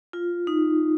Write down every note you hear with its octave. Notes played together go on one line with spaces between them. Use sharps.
F4
D#4